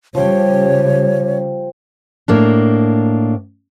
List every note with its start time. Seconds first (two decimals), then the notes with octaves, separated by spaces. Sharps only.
0.15 C#3 F3 G3 C#5 G5
2.28 A2 A#3 D4